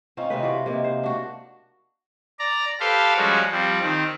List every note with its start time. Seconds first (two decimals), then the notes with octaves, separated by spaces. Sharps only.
0.17 C4 C#4 D#4 F4
0.30 C3 D#4 B4
0.42 E3 F4 F#4 D5
0.66 C3 A#3 D#4
0.84 C5
1.03 D4 F#4
2.39 D5 A#5
2.80 G4 A4 B4 C5 F5
3.17 F3 G3 G#3 C#4 F#4
3.52 F3 G3 C4
3.82 D#3 C4